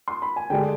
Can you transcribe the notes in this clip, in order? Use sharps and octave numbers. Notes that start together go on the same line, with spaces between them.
C6
B5
G#5
D3 G#3 D4 G#4 G5